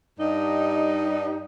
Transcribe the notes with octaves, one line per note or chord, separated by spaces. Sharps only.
G2 G3 D#4